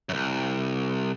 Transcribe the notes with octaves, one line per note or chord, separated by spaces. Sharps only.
C2 F#2